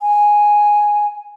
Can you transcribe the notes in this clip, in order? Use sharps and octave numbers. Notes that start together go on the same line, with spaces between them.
G#5